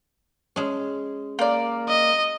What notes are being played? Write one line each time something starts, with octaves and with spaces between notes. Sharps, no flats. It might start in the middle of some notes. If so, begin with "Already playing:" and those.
G#3 C#4
A#3 D5
D#5